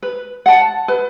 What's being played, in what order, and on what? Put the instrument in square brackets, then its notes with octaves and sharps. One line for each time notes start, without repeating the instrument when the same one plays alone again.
[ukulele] B4
F#5 A5
B4